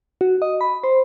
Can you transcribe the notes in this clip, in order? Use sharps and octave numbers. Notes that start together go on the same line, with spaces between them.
F#4
D#5
B5
C5